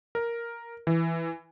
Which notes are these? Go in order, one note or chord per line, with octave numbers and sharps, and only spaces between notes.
A#4
E3